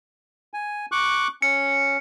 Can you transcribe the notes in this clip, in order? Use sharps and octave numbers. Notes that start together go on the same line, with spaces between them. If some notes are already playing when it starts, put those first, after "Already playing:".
G#5
C#6 D6 F#6
C#4 C#7